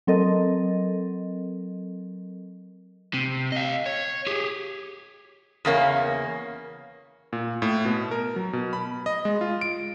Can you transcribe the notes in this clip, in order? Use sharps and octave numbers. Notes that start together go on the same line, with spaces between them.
F#3 C4 A4 A#4 D#5
C3
D#5 F5
C#5
G4 G#4
E2 C#3 A#3 C#5
A#2
A2
B2
A#4
F#3
B2
B5
D#5
G#3
F4
D7